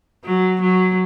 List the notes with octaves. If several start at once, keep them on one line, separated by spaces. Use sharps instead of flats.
F#3
F#3